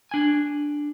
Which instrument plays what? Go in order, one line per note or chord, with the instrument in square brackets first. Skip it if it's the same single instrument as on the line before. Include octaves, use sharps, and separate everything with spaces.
[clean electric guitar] D4 G#5